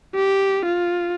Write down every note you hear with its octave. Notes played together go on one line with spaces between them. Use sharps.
G4
F4